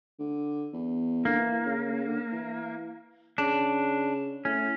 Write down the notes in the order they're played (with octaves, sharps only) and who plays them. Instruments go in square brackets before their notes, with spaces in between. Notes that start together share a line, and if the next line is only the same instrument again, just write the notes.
[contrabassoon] D3
E2
[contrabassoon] D3 [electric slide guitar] A#3
[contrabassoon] E3
C#3
C#3
C#3
D3
E3
[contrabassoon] C#3 [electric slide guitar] D4
[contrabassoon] A2 [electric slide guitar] C#4